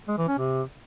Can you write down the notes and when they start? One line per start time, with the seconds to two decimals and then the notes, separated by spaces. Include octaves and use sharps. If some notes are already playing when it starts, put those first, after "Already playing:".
0.08 G#3
0.18 E3
0.28 C#4
0.38 C3